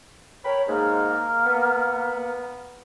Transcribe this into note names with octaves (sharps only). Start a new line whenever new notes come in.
A#4 C#5 G5 B5
G#2 A#3
B3